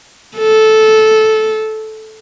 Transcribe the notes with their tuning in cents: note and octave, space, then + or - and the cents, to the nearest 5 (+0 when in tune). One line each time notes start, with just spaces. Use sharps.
A4 -10